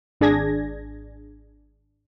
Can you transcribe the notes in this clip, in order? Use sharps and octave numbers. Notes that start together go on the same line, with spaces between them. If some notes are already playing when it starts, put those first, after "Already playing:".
G#1 D4 G#4 G#6 A#6